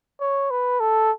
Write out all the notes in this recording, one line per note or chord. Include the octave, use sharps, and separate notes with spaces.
C#5
B4
A4